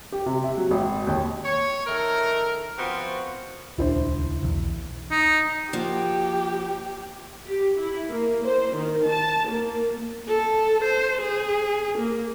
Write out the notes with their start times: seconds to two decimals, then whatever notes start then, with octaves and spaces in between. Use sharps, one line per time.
0.12 G4
0.26 C3
0.44 E5
0.57 F#3
0.71 G#1
1.07 D#2
1.44 C#5
1.86 D#3 A3 A#4
2.77 F3 B3 C4 F4 F#4
3.78 D#1 C#2 D4 E4 C5
4.43 B1 E2
5.11 D#4
5.73 F3 A#3 F#4 G4
7.47 G4
7.79 E4
8.09 A#3
8.45 C5
8.75 D#3
9.08 A5
9.49 A#3
10.28 A4
10.84 C5
11.21 G#4
11.98 A#3